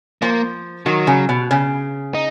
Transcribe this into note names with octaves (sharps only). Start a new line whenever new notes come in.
F3 A#3
D#3 F#3
C#3
B2
C#3
D#4